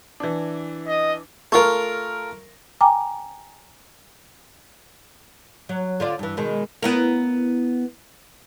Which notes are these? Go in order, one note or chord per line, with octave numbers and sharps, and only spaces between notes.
E3 D4
D#5
A3 F4 A#4 C#6
G5 G#5 A#5 D6
F#3
D3 F4 D5
G2 E3
B2 D#3 G#3
B3 E4 A#4